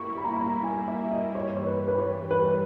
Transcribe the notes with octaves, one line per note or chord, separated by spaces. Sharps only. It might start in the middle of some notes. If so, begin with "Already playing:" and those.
Already playing: G3 A#3 E4 C#6
B5
A#5
B5
A#5
G#5
E5
D#5
G2 E3 G3 C#5
C#5
B4
B4
C#5
B4
B4